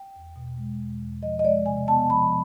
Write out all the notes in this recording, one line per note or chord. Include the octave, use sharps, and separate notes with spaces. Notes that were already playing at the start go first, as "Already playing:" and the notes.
Already playing: G5
E2
B2
G#3
E2
E2
F3 D#5
D#5
G#3 D5
C3 G#5
B3 A5
F3 B5